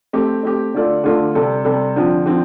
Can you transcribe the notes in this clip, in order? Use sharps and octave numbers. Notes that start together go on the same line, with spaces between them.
A3 C4 G4
A3 C4 G4
D3 A3 F4 A4 D5
D3 A3 F4 A4 D5
C3 G3 C4 A4
C3 G3 C4 A4
D3 F3 C4
D3 F3 C4